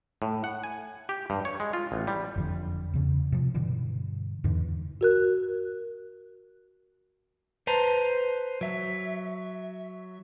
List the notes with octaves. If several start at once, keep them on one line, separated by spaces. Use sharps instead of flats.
A2
F#5
G#5
G4
G2
C#5
G#3
F4
A1
G3
F#1 F2 D3
E2 C#3
C3 F3
G2 B2 D3 E3
E2 G#2 D3 E3
F#4 A#4 F#6
B4 C5 A5 A#5
F#3 E5